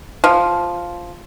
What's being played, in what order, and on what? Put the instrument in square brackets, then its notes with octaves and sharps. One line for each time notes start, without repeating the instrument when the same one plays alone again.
[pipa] F3